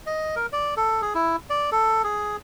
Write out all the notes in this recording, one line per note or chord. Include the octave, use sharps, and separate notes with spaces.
D#5
A#4
D5
A4
G#4
E4
D5
A4
G#4